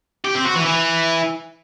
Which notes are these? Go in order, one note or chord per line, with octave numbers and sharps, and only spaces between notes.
G4
C4
F#4
E3
E3